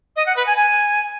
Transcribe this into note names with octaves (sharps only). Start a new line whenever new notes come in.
D#5
F#5
B4
G#5
G#5